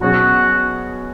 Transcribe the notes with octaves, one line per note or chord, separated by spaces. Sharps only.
B2 F#3 C#4 F#4 G#4